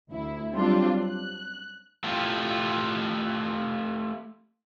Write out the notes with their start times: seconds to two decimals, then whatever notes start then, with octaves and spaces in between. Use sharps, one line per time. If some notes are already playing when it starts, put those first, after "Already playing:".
0.10 D2 E4
0.53 F#3 G3 C4 D4 F4
1.02 F#6
2.04 A3 E4 F4 G4 A4